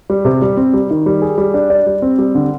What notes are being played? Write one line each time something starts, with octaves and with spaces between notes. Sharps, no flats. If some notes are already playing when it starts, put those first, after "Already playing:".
G3
C3
G3
C4
G3
D#3
G3
G#4
G3
D4
D5
G3
C4
G3
D3